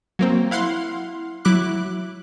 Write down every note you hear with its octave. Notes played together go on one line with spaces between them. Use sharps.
F#3 A#3 C4
E4 F5 F#5 C6
F#3 E4 D6 F#6